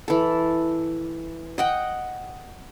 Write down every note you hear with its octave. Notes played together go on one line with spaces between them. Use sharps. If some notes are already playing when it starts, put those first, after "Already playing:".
E3 A4
D#5 F#5 G5